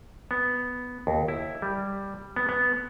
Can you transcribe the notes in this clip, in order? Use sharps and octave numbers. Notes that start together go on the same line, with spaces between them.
B3
D#2
E4
G3
B3
B3